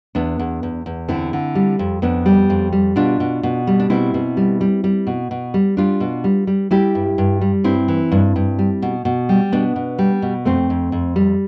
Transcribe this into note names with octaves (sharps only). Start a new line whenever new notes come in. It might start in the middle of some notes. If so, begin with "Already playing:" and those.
E2 B3 D4
E2
E2
E2
D3 C4 E4
D3
G3
F2
F2 B3 D4
G3
F2
G3
B2 D4 F4
B2
B2
G3
D4
B2 C4 E4
B2
G3
G3
G3
B2
B2
G3
G3 D4 F4
B2
G3
G3
G3 E4 G4
G2
G2
G3
G2 C4 E4
E3
G2
G2
G3
B2
B2
G3
B2 B3 D4
B2
G3
B2
F2 A3 C4
F2
F2
G3